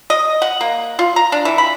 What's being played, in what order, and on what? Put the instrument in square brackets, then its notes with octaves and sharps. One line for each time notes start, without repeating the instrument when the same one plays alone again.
[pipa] D#5
F#5
A#3
F4
A#5
D4
E3
B5